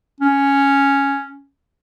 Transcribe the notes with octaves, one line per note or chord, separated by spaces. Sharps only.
C#4